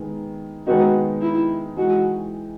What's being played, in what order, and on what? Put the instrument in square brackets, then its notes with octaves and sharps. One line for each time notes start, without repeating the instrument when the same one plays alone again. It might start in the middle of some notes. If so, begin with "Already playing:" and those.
Already playing: [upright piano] D#3 G#3 B3
[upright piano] D#3 G#3 B3 D#4 [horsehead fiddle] F#4
[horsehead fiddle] E4
[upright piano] E3 G#3 D#4 [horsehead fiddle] F#4